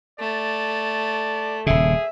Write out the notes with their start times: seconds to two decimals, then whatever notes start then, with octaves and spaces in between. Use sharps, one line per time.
0.20 A3 D5
1.66 D#1 C#3 G#4 E5